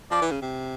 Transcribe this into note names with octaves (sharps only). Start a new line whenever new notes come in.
F3 D5
E3
C#3
C3